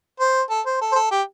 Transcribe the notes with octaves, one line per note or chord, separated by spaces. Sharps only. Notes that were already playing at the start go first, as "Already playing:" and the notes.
C5
A4
C5
A4
C5
A4
G4